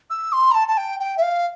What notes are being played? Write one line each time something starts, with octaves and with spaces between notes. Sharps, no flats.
E6
C6
A#5
A5
A5
G5
G5
E5
F5